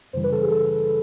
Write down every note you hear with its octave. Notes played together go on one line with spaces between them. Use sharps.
F#2 C#3 E3 G3 C5
B4
A4
G#4
A4